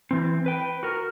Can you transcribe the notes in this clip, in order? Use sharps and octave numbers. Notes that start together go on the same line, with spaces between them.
E3 C4
B4 G5
F#4 A#4